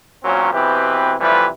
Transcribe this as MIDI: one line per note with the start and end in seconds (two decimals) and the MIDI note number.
0.23 0.53 32
0.23 0.53 46
0.23 0.53 54
0.23 0.53 60
0.23 0.53 61
0.23 0.53 70
0.53 1.14 47
0.53 1.14 52
0.53 1.14 60
0.53 1.14 67
0.53 1.14 71
1.20 1.46 48
1.20 1.46 52
1.20 1.46 53
1.20 1.46 55
1.20 1.46 57
1.20 1.46 71